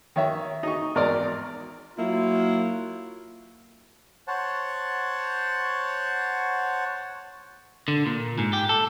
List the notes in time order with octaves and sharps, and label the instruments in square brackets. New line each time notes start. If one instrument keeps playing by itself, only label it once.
[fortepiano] D#3 C#5 E5
D#4 C#6
G#1 E2 A#4 D5 C6
[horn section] F#3 A#3 E4 F4
[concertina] C5 C#5 F#5 A5
[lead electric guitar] D3
A#2
G#2
G4
A4